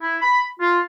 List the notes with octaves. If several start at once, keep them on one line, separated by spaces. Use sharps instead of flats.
E4
B5
F4